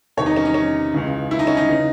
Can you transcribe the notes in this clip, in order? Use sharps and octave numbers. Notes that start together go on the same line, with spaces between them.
E2 C3 D#3 C#5
D#4
C#4
D#4
C#4
C#2 C#3 E3
E4
D#4
C#4
D#4
C#3 E3